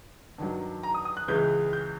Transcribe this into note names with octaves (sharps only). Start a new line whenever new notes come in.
G2 D#3 F#3
A#5
D#6
D#6
F#6
C#2 C#3 E3 G#3 G6
G6